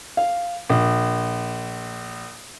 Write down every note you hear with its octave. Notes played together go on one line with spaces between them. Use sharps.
F5
A#1